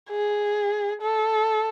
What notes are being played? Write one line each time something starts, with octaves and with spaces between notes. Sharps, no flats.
G#4
A4